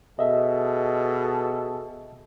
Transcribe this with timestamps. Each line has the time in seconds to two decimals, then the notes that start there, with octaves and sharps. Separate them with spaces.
0.19 B2 G#4 A4 D#5 E5